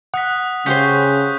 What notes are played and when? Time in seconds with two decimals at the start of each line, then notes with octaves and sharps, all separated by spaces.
0.14 F#5 D#6 F#6 B6
0.66 C#3 C#4 G4 C5 C#6 G6 B6